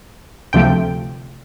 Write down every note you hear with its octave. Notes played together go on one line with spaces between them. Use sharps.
D2 C3 F3 A3 G5